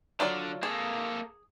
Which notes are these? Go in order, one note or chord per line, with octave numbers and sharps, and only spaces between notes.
D3 F#3 F4 D5
A#3 G#4 A4